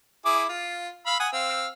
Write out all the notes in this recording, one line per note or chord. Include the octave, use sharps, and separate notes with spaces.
E4 G#4 D6
F4
F5 B5 E6
F#5 G#5 D#6
C4 F5 E6